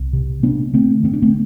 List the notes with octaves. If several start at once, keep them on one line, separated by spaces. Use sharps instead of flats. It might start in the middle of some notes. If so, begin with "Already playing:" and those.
Already playing: C2
C3
C3 B3 D4
D3 A3 C4
D3 C4
D4
A3 C4